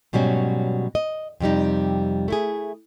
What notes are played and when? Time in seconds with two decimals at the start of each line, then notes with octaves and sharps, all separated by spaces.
0.13 G#2 B2 F#3 G3 C#4
0.95 D#5
1.40 F2 C3 G3 D#4
2.28 A3 E4 G#4